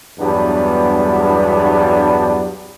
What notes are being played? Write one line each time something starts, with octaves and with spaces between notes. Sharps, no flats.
E2 G2 F#3 G3 B3 D4